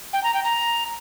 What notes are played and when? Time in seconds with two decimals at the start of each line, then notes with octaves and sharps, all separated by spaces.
0.13 G5
0.23 A#5
0.34 G5
0.44 A#5